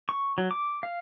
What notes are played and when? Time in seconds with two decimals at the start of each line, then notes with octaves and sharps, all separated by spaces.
0.09 C#6
0.38 F#3
0.51 D6
0.83 F5